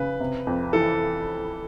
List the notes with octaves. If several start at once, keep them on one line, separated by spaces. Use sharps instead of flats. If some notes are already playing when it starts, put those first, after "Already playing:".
Already playing: C#3 B4
C3
F2
E3 A4